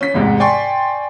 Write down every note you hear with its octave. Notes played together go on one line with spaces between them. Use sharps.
C#4 B6
A1 E2 G#2 C3
D5 G5 G#5 C6 C#6